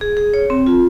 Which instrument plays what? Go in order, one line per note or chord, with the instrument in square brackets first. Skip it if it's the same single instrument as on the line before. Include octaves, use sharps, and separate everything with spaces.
[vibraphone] G#4
G#4
C#5
C4
F4